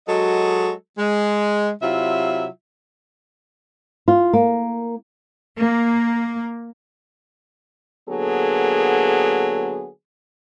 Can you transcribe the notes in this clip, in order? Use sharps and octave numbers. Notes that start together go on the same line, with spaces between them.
F#3 G#3 F#4 A4 D#5
G#3
C3 F#3 E4 F4 E5
F4
A#3
A#3
D3 F#3 A#3 B3 G#4 A4